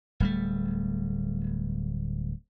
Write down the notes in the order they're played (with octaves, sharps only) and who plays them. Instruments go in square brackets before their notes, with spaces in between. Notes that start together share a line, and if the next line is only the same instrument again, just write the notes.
[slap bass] D1 G3 A3